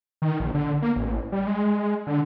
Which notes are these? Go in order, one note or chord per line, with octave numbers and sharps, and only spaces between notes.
D#3
A#1
D3
A#3
A1
G3
G#3
D3